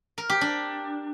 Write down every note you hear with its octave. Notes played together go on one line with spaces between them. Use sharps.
A#4
G4
D4